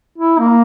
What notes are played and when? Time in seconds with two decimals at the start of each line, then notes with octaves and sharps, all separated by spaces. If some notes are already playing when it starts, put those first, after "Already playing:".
0.18 E4
0.39 A#3